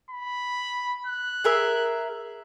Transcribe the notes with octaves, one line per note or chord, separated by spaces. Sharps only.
B5
F#6
G#4 A#4 E5